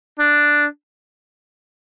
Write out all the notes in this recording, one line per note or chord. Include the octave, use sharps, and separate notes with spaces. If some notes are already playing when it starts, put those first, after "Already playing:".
D4